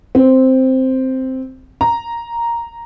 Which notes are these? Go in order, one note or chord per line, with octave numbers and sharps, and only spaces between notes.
C4
A#5